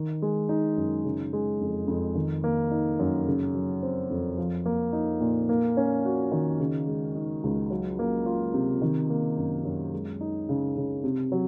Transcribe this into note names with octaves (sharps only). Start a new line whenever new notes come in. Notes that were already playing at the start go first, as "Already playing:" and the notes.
Already playing: D#3
G#3
D#4
F#2
C#3
G#3
F2
F2
D#3
A#3
D#4
F#2
C#3
F#3
C4
F2
F3
A#3
D#4
A#2
A#3
C#4
F#4
D#3
C#3
G#3
D#4
C#2
F#3
A#3
F4
C3
D#3
A#3
F#2
F#2
G#3
D#4
C#3
C#3
C3
F#3